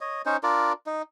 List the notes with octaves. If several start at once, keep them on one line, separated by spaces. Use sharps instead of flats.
C#5 D#5
C#4 D#4 C5
D4 F4 A#4 D5
D#4